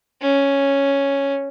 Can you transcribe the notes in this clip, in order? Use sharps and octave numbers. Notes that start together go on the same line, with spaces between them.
C#4